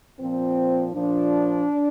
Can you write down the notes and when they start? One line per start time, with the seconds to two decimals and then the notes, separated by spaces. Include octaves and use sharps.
0.19 A#2 F3 C4
0.93 A#2 F3 D4